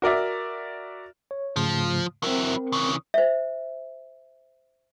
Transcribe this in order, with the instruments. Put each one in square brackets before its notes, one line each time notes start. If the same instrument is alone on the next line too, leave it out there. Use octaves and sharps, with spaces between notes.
[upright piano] F#4 A#4 D5 E5
[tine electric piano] C#5
[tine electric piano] G#2 C#3 A3 [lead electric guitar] F3
[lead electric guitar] F#3 E4 [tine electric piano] C4 A#4
[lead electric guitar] C#3 E3
[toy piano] C5 E5